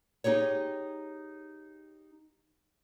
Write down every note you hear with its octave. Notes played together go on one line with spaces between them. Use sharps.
D#4 G4 G#4 C#5